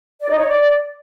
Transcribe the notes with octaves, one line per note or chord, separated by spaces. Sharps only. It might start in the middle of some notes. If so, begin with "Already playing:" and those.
D5
D#4
C#5
D5